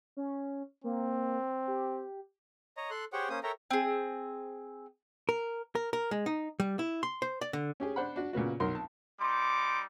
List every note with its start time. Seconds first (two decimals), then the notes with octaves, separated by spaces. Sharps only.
0.17 C#4
0.84 A#3 C4
1.67 G4
2.77 C#5 D#5 A#5
2.90 A4 C6 F#6
3.13 G4 G#4 C5 C#5 F#5 G5
3.30 A#3 C#4 C5 D#6
3.43 A4 A#4 C#5 E5 G5 A#5
3.71 C4 G#4
5.29 A#4
5.75 A#4
5.93 A#4
6.11 G#3
6.26 D#4
6.60 G3
6.79 E4
7.03 C6
7.22 C5
7.41 D5
7.53 D3
7.80 C#4 G4 G#4
7.96 D4 C5 F#5 B5
8.16 D4 F#4
8.33 A#2 C#3 B3 F#4
8.60 B1 F#3 A#4 C6
8.75 A5
9.20 G3 D#4 C6 D6